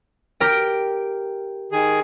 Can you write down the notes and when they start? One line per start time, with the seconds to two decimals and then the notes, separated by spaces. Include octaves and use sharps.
0.40 G4 A#4 G5
1.72 D#3 G#4